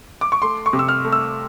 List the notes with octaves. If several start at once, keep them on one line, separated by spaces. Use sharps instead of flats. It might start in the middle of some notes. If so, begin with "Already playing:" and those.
D6
C#6
A3 C6
C#6
C3
E6
F6
A3
E6